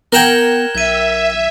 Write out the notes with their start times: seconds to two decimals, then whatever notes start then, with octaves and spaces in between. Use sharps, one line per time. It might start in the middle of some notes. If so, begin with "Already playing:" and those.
0.12 B3 A#4 F#5 G5 G#6 E7 G7
0.75 B1 E5 G#6 D#7